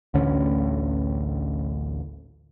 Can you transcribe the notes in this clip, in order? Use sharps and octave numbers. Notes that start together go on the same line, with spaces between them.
A1 D2 D3 C#4